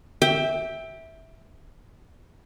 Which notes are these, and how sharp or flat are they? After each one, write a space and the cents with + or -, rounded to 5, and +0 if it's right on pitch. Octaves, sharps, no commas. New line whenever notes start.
E5 -10 G5 +15